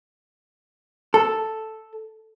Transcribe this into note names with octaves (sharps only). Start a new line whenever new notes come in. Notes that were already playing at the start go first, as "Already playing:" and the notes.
A4